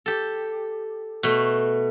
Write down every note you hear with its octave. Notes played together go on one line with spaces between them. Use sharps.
G4 A4
B2 A3